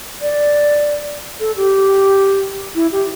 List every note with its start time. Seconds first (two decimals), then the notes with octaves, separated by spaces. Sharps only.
0.22 D5
1.40 A4
1.56 G4
2.75 E4
2.92 G4